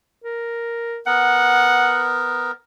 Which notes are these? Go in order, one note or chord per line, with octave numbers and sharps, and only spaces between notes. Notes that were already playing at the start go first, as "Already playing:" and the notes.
A#4
B3 A#4 F#5